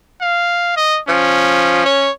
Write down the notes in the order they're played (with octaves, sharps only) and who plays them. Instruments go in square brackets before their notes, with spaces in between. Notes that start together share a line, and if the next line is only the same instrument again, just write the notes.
[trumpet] F5
D#5
[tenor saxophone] F3 [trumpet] C#4
[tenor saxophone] C#5